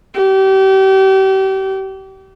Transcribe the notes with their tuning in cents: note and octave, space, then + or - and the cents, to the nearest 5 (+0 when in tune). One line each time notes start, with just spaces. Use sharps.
G4 -35